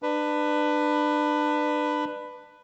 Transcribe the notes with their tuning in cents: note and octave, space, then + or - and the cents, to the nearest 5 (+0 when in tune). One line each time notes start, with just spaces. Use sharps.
D4 +25 B4 +10